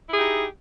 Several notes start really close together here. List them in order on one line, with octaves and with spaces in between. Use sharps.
E4 G#4 G4 D#4